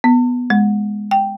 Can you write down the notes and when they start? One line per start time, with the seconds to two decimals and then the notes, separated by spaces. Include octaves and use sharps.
0.04 B3
0.50 G#3
1.11 G5